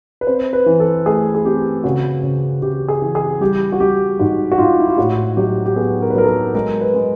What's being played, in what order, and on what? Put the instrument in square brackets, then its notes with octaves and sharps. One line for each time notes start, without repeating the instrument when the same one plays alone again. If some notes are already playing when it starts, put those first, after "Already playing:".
[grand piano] B4
C4 C5
B4
E3
A4
A3 G#4
G#4
C4 G4
C#3 F#4
C#3
C#3 G4
G#4
E3
G#4
G3 G4
F#4
G3 G4
G#2 F#4
F#4
G#2 F4
E4
F4
A2 F#4
F#3 G4
G4
B3 G#4
A#4
B4
F#3 A#4
A4
A#4
G#3 A#4
B4
G#3